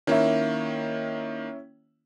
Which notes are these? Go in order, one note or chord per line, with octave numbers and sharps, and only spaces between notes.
D#3 A#3 C#4 E4